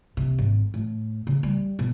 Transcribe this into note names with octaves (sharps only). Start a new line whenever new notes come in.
C3
G#1
A2
C#3
G3
B2